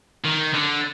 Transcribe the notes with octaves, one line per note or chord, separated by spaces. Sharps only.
D#3
D3